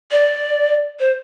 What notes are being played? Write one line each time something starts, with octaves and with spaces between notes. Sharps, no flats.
D5
C5